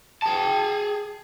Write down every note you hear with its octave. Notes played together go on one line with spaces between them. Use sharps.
G#4 A5